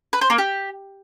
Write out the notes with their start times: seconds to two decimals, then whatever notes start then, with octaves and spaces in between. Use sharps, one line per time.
0.13 B4
0.21 C5
0.30 A#3
0.38 G4